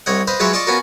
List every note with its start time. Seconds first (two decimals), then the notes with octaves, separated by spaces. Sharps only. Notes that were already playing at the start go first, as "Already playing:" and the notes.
0.06 C2 C#5 D#5 F#5
0.27 B4 C5 D#5 F5
0.40 F#3 G#3 F4 B4 C#5 E5
0.53 F4 D5 D#5 A5 C#6
0.67 B3 C#4 F4 F#4 A#4